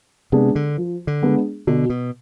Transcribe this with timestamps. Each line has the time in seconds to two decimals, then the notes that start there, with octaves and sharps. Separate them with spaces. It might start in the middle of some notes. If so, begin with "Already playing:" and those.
0.32 C3 G#3 B3 D4 G#4
0.55 D3
0.77 F3
1.07 D3
1.23 G#3 B3 D4 G#4
1.67 B2 D3
1.90 B2